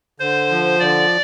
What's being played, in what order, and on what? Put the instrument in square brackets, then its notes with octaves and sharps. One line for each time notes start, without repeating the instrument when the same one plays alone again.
[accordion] D3 [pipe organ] C5
[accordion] F3
[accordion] D3 [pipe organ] D5